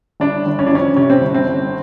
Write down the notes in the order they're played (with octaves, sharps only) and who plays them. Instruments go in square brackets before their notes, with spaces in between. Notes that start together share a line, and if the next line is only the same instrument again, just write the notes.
[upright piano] G1 D4
G1
C#4
D4
F2 C#4
C3 C#4
C4
G1
C4
G1